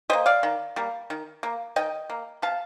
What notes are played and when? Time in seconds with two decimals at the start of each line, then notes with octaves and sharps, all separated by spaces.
0.10 G3 A#3 C5 D#5
0.26 D5 F5
0.43 D#3
0.76 G3 A#3
1.10 D#3
1.43 A#3
1.76 D#3 D#5 G5
2.10 A#3
2.42 C3 F5 A5